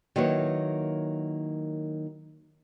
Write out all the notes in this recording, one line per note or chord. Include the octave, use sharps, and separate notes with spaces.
D#3 F#3 A#3 E4 B4 C#5